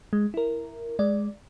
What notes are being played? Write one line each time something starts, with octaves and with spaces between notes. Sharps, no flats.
G#3
E4 A#4
G#3 D5